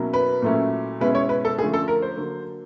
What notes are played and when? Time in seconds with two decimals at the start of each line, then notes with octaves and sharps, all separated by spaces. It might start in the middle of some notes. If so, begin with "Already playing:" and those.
Already playing: B2 F#3 A#3 C#4 E4
0.14 B4
0.42 A#2 F#3 A3 C#4 E4
1.00 B2 G#3 C#4 E4 B4
1.15 C#5
1.29 B4
1.45 A4
1.59 D3 F3 A3 C#4 G#4
1.74 A4
1.88 A#4
2.02 C5
2.17 D3 F#3 A#3